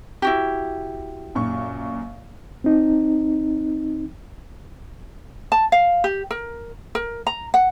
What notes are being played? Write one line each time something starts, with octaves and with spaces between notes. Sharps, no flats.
E4 F#4 G4
F#2 A#2 C#6
C4 D#4
A5
F5
G4
A#4
A#4
A#5
F#5